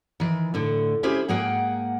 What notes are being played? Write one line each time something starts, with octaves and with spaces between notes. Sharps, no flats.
D#3 E3
A2 D3
C#4 E4 G4 G#4 C5
G#2 A#3 G#4 F#5 G5